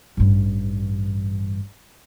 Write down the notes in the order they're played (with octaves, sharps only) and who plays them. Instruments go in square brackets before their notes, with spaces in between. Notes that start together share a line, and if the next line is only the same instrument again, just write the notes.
[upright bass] A1 G2